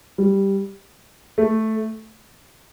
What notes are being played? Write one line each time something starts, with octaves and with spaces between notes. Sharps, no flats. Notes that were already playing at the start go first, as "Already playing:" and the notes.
G3
A3